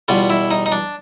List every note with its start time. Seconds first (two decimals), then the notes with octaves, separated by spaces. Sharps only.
0.08 E2 B2 G3 F4
0.30 E4
0.51 D#4
0.66 D#4
0.72 D4